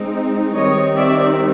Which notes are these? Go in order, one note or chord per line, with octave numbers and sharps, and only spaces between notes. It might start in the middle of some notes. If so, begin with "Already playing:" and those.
Already playing: G#3 C4 D#4
D#3 G3 C4 C#5 D#5
D5 E5